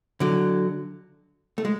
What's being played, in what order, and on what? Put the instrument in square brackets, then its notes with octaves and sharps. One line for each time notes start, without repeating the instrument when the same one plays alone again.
[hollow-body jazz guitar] D3 F#3
A3
G#3